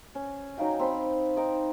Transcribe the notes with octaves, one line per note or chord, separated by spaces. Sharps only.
C#4
F#3 D#4 F5 G5
C4 B5 C6
D#4 G5 D6